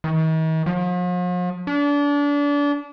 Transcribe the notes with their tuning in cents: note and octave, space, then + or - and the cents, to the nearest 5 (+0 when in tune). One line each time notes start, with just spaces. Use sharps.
D#3 +45
F3 +45
D4 -30